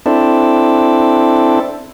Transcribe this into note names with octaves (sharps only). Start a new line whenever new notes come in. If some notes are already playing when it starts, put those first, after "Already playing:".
C4 D4 E4 A4